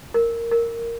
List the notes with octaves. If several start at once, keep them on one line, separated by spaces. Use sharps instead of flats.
A#4
A#4